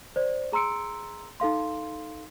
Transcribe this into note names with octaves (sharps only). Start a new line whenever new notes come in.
C5 D5
G#4 A#5 C6 E6 C#7 D7
D#4 A4 F5 C6